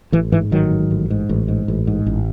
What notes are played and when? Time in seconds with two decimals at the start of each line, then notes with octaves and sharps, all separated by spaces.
0.12 A1 E3
0.32 G#2 E3
0.51 A1 D#3 F#3
0.71 G#2
0.91 A1
1.10 G#2
1.29 A1
1.48 G#2
1.68 A1
1.87 G#2
2.06 A1